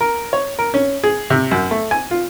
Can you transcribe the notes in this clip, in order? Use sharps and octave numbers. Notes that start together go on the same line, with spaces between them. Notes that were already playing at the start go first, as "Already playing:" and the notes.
A#4
C#5
A#4
C#4
G#4
C3
F#2
A3
G#5
F4